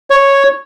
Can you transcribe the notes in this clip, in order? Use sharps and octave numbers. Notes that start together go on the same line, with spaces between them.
C#5